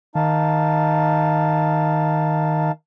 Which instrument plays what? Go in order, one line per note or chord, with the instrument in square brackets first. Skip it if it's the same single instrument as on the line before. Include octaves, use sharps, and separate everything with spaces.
[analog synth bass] D#3 [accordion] D#4 F5 A5